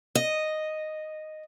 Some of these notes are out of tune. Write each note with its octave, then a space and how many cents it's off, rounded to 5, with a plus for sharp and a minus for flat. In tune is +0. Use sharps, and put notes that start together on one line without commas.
D#5 -5